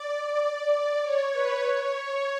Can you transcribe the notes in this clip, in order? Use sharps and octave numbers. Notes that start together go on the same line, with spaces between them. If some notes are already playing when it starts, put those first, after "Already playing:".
Already playing: D5
D5
C#5
B4
C#5
C#5